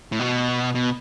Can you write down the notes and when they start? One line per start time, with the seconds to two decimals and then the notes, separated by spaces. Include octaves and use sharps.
0.12 A2
0.19 B2
0.75 B2